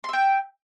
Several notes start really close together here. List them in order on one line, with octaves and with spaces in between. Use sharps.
C6 E5 G5